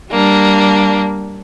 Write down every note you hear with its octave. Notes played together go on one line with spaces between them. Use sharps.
G3 A#3 D4